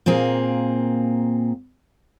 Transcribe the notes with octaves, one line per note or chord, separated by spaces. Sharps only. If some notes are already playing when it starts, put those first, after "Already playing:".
A#2 A#3 C4 G#4